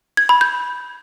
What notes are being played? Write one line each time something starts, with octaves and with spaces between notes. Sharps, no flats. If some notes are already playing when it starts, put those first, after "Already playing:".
G#6
B5
G6